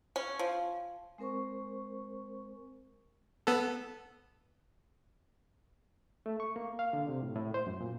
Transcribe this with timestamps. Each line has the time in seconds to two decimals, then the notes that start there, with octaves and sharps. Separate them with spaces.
0.16 C#4
0.39 F3
1.18 G#3 C4 A#4 C5 C#6
3.47 B3 A4
6.26 A3
6.40 C#6
6.56 A#3
6.79 F5
6.93 D3
7.09 C3
7.23 A2
7.36 A2
7.54 C5
7.67 F#2
7.81 A#2